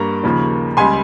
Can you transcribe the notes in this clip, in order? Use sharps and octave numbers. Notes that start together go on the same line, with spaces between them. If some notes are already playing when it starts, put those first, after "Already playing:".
Already playing: G2 G3 A#3 A#5 C#6
D#2 C#3 F3 A#3
C#2 C#3 G3 G#5 C6